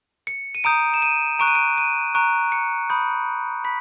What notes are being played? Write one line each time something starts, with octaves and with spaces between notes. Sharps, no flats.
C#7
D#7
A#5 D#6 G6 D7
E7
D#7
A#5 C#6 F#6 D7
D#7
D7
D#7
A#5 C#6 F#6 D7
C#7
B5 D#6 G6
B5 B6